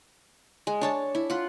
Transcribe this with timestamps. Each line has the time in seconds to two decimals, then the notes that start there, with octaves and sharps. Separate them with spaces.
0.67 G#3
0.81 D4 C#5 A5
1.15 E4
1.30 F4 F#5